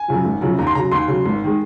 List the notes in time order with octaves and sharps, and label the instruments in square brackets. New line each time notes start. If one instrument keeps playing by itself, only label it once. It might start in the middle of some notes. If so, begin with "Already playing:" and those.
Already playing: [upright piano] G#5
F#2 C#3 F3
G#1
F#2 C#3 F3
D#2 A#5
C6
C#3 F#3 A#5
D#2 C6
C#3 F#3
G#1
D#3 G#3